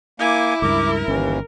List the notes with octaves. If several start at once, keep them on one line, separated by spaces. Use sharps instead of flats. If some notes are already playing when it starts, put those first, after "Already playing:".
A#3 E4 G#5 D6
C#2 G2 A#4 D6
G1 D#2 E3 C#4